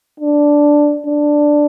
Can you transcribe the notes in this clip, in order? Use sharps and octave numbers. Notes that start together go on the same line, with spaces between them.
D4
D4